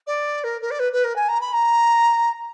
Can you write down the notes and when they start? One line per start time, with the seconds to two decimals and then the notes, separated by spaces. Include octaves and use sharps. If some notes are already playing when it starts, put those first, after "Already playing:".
0.07 D5
0.44 A#4
0.61 A#4
0.71 D5
0.79 B4
0.92 B4
1.04 A#4
1.16 G#5
1.28 A#5
1.41 B5
1.53 A#5